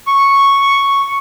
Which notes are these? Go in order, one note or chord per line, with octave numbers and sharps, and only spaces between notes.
C#6